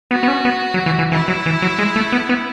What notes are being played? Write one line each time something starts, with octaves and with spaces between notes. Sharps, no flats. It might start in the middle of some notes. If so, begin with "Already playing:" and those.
B3 F#4
B3
C#4
B3
F#3
E3
E3
E3 E4
F#3
E3
F#3
G#3
A3
B3
B3